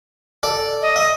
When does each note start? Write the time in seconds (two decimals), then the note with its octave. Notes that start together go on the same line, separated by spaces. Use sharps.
0.43 A4 D5
0.82 D#5
0.96 E5